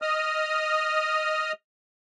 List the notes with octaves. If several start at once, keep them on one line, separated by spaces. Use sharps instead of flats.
D#5 D#6 F6